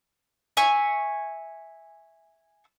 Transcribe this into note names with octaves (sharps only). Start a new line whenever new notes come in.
E5 G#5 C#6